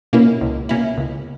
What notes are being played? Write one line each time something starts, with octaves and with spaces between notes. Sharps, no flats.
B2 A#3 C#4 E4
C#2
B2 A#3 C#4 E4
C#2